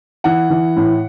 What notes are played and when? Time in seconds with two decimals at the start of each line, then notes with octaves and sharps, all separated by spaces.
0.24 E3 F#5
0.50 E3
0.76 A2